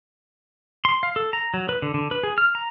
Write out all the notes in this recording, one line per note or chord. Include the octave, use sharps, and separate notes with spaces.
C6
F5
A4
A#5
F#3
B4
D3
D3
B4
G#4
F6
A#5